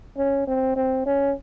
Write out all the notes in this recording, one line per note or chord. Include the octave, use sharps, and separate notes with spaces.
C#4
C4
C4
C#4